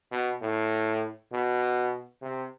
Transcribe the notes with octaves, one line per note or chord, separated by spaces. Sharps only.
B2
A2
B2
C3